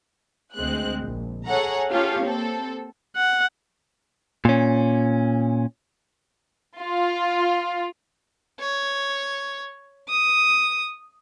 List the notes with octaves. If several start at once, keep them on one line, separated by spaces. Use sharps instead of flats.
D2 G#3 C4 F#6
A#1
G#4 A4 C#5 F#5 A#5
C#4 F4 G4 A4 C#5 F5
A#3 C4 A4
F#5
A#2 C#4
F4
C#5
D#6